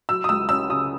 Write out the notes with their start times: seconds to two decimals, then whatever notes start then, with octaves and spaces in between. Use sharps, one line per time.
0.09 F#3 E6
0.24 D#6
0.29 C#2 E6
0.49 C#4 E6
0.69 C#3 D#6